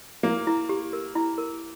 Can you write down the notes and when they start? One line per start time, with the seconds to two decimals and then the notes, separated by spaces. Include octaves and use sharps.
0.23 A#3 E4
0.47 E4
0.69 G4
0.93 A#4
1.15 E4
1.38 A#4